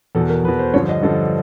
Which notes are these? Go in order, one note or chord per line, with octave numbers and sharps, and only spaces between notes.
E2 B2 A4
A#4
E2 B2 B4
C5
G2 D3 F3 C#5
D#5
G2 D3 F3 A4